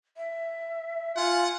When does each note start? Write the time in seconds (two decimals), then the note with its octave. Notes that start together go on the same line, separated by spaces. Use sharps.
0.17 E5
1.16 F4 F#5 G#5